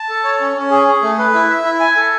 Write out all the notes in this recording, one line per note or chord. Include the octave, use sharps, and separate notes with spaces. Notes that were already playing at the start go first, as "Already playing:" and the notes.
Already playing: A5
A4
C#5
C#4
C#4
G#4
G#4
A3
B4
E4
E5
E4
G#5
A4